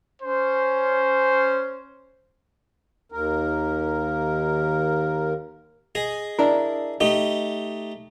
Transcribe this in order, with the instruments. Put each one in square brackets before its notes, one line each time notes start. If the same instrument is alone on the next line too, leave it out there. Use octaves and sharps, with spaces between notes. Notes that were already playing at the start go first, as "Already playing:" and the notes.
[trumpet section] C#4 C5
[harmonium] D#2 A#4
[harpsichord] G#4 D#5
[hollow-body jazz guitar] D4 E4 A#4
[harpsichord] A3 D#4 G4 [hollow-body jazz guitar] D#5